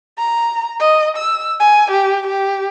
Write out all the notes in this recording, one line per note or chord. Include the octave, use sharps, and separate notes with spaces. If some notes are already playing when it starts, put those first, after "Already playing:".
A#5
D#5
E6
G#5
G4
G4